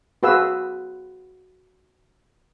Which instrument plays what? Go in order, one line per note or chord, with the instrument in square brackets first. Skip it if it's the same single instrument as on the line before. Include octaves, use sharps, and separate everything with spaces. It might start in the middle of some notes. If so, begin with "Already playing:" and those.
[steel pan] F#4 G#4 B4 F5 E6